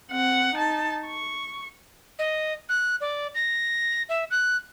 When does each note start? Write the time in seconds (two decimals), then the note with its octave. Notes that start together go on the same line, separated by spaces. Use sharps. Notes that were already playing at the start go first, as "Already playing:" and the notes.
0.10 C4 F#5
0.54 D#4 A5
1.07 C#6
2.19 D#5
2.69 F#6
3.01 D5
3.35 A#6
4.09 E5
4.31 F#6